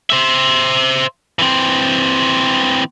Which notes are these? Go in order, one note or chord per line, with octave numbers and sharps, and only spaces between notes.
C5 E5
E3 C4